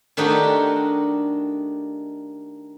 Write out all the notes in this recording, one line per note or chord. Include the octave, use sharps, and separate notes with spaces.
D#3 A3 D4 D#4 F#4 G4